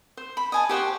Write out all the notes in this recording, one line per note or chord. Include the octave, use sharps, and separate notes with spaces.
C5
B5
D#5 G#5 A5
G4 C5 F#5 C#6